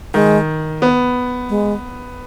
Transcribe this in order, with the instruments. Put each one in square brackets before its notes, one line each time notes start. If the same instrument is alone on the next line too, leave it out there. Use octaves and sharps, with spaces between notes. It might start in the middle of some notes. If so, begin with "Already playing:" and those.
[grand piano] D#3 [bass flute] G#3
[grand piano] B3
[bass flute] G#3